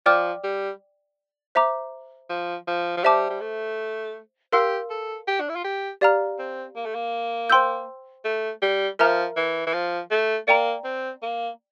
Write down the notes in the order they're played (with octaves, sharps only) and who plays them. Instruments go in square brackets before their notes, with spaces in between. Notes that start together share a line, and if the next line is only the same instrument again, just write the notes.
[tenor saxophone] F3 [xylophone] D5 G5 D6 F6
[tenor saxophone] G3
[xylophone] C5 E5 A#5 D6
[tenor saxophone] F3
F3
F3
[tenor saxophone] G3 [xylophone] C5 E5 A5 D6
[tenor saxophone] G3
A3
[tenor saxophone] G4 [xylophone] A#4 F5 C6 E6
[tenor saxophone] A4
G4
D4
E4
F4
G4
[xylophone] G4 D5 F5 A#5 F6
[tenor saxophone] C4
A#3
A3
A#3
[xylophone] C5 G5 C6 E6 G6
[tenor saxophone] A3
G3
[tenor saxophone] F3 [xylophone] A#4 E5 A#5 F6
[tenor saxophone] E3
E3
F3
A3
[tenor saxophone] A#3 [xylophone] D5 G5 A#5
[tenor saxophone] C4
A#3